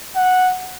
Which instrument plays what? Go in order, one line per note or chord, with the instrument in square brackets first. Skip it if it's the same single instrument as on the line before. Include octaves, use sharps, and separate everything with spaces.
[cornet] F#5